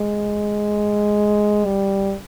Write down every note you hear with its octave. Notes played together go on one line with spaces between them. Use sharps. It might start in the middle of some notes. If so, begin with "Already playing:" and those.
Already playing: G#3
G3